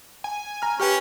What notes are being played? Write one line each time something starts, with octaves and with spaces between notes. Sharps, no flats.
G#5
A#5 F6
C#4 G4 B4 G5 F6